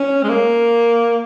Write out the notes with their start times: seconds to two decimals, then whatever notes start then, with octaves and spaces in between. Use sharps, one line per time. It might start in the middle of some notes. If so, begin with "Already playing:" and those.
Already playing: C#4
0.23 G#3
0.29 A#3